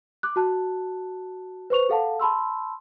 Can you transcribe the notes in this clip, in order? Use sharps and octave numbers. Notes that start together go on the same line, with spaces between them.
D6 F#6
F#4 A5 F#6
B4 C5 C#6 F7
G#4 A4 F5 F#5 A5
A5 B5 C6 E6